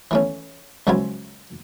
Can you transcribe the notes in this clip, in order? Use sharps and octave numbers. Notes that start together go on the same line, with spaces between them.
E3 A3 C#4
C#2 F3 F#3 C#4 E4 G#5